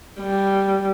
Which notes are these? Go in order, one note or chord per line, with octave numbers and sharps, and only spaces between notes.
G3